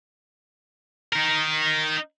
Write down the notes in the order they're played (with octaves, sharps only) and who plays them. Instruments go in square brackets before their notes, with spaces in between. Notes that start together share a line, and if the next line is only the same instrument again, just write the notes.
[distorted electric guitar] D#4 A#4